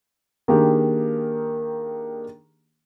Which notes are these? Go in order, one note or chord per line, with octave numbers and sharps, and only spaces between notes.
D#3 A#3 D4 G4 G#4